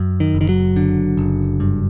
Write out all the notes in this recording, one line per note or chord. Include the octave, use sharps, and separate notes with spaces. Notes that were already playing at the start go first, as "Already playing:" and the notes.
Already playing: F#2
D#3
F#1
D#3
F#3
D3
F#1
G2